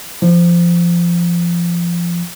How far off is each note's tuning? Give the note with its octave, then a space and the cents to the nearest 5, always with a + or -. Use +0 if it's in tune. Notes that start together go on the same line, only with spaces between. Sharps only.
F3 -20